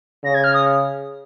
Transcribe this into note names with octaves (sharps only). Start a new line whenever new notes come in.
C#3 A#6
G#6
F6
D#6